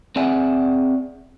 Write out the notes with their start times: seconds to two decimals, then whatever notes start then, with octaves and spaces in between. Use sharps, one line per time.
0.16 C4 G#4 D5 E5 F#5 G#5